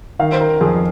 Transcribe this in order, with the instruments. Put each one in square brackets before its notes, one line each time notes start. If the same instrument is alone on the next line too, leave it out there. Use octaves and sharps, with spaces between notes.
[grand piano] D#3 [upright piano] F5
[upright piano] C5
A#4
[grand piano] F2 [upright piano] G#4